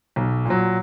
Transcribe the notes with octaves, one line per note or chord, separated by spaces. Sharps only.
B1
A#2 F#3